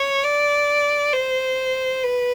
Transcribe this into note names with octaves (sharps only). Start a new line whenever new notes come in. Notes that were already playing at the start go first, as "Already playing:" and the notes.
Already playing: C#5
D5
C5
B4